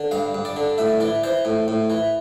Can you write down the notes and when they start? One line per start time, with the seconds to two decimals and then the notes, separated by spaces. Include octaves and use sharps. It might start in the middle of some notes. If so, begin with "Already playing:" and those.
Already playing: D3
0.11 G2 F5
0.34 G2
0.45 D5
0.56 D3
0.78 A2 E5
1.00 E3 D5
1.24 E3 C5
1.45 A2
1.68 A2
1.90 E3